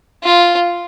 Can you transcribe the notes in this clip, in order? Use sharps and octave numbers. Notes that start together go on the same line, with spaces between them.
F4